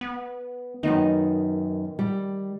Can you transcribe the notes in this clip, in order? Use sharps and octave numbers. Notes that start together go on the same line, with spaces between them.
B3
F#2 D#3 B3 D#4
G3